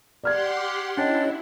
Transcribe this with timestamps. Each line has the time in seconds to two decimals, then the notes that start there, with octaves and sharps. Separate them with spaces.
0.24 G4 D5 F#5 C6 F6 G#6
0.57 D6
0.97 C#4 D4 E4 C#5 D#5 G5